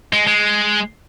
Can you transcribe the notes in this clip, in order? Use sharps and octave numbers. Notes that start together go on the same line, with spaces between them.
G#3
G#3